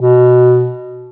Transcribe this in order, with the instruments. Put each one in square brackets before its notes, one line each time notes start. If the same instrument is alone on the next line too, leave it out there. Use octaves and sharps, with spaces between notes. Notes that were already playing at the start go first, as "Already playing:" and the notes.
[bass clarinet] B2